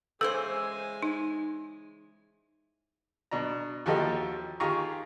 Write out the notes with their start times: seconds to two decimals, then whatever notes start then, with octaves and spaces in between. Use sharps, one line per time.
0.21 C#3 E3 G#3 A4 C5 G#5 E6
1.03 D#4
3.31 B2 D4 A#5
3.86 D#2 F3 F#4 G4 A4 D#5
4.60 D#3 F4 G4 G#4 A#5 C#6